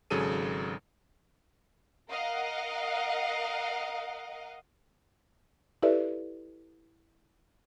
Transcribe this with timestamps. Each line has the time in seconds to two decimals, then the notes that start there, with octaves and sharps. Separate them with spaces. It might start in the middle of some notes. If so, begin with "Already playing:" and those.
0.10 G#1 C#3 F#3 G#4 A4 D#7
2.10 A#4 D#5 F5 F#5
5.83 E4 G4 A4 B4 D5 E5